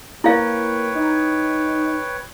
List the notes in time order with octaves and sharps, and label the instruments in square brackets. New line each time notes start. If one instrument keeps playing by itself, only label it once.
[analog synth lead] A#3 [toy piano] E4 F5 [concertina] B4 C#5 G5
[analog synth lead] D#4